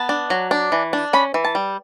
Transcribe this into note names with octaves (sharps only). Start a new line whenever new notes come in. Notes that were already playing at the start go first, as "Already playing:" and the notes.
Already playing: B3 A5
D4
F#3
D4
E3
D4
C#4 B5
E3
A5
G3